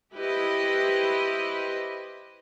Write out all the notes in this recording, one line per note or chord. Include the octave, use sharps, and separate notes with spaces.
E4 G4 B4 C5 D#5